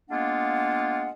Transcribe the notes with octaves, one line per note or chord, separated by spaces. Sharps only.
G#3 A#3 B3 D4 F4 F#5